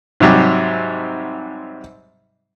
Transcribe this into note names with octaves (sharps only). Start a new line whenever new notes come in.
G#2 C3 F#3 G3